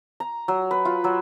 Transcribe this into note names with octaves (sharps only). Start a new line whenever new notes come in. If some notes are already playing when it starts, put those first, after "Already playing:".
A#5
F#3
B4
F4
F#3